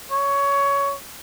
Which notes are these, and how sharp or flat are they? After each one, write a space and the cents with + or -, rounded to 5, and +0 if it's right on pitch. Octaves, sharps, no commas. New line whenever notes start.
C#5 +15